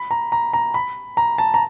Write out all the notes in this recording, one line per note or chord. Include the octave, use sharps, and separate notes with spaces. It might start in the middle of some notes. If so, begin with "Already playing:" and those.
Already playing: B5
A#5
A#5
A#5
B5
A#5
A5
A#5